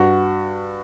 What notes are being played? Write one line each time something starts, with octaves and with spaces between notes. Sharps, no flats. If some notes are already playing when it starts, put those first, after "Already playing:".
Already playing: G2 F#4